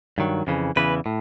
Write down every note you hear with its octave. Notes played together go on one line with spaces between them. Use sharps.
G2 D#3 F#3
F2 C#3 E3
E2 C#3 E3 B4
A2